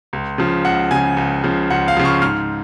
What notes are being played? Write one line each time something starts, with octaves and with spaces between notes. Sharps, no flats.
C#2
C#3 F3
C#2 F#5
C#3 F3 G#5
C#2
C#3 F3
C#2 F#5
F5
C#3 F3
C#6
G#2 F6